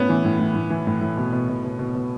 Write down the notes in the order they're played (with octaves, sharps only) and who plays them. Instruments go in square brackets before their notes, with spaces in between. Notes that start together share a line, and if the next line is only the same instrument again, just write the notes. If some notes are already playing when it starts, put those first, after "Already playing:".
Already playing: [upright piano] A2 B3 C#4
E3
A2
A2
A2
E3
A2
A2
B2
B2
B2
B2
B2
B2